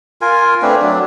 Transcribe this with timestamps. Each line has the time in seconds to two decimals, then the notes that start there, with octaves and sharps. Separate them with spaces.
0.21 F4 A#4 G#5
0.62 A3 C4 D4 B4
0.82 F#3 D4